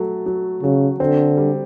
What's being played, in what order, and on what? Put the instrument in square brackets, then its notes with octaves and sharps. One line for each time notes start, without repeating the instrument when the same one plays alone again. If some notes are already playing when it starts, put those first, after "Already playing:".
Already playing: [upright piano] F#3 A3
F#3
[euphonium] C#3 [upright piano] F#3
[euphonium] D3 [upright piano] C4
[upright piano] G3